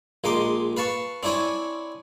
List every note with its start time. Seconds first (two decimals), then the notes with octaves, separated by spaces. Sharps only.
0.24 A#1 G#3 D#4 C6 D6
0.77 B4 F5 A5 C#6
1.23 C4 D4 E4 C#5 G#5